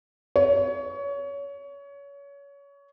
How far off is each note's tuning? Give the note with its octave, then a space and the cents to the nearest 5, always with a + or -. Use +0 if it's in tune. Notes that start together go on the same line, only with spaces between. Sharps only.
C#5 +25